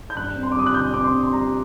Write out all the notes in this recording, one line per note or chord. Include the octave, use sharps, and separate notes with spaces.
G6
G2 F#6
C4
C6
D6
G3 D#6
F#6
D3 G6
C4 D6
C6
G2
C6
G3 A#5